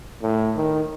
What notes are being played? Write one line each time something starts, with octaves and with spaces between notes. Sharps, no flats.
A2
D#3